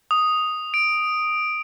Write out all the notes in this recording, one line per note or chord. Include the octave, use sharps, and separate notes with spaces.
D#6
D7